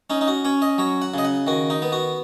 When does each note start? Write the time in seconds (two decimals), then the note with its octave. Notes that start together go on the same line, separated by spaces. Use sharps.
0.10 C#4 D#4
0.21 D#4
0.28 F#4
0.45 C#4 C#5
0.62 D#5
0.78 F#3 C#5
1.02 F#5
1.14 C#3 D#5
1.25 F#5
1.47 D#3 F#4
1.70 D#4
1.82 B3
1.92 F#4